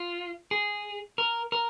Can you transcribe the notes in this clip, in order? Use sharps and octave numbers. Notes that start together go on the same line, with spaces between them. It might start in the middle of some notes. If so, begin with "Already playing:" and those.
Already playing: F4
G#4
A#4
A#4